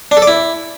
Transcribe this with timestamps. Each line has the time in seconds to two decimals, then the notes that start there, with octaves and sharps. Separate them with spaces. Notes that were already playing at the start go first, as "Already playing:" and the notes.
0.11 D4
0.17 A4
0.22 D5
0.28 E4